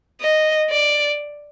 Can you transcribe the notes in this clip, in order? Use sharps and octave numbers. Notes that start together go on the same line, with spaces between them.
D#5
D5